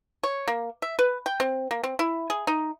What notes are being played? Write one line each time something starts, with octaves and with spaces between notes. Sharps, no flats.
C#5
A#3
E5
B4
G5
C4
A#3
C4
E4
G#4
D#4